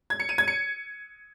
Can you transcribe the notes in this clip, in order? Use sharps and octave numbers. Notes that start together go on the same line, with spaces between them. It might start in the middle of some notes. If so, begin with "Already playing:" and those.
G#6
C#7
D#7
G#6
C#7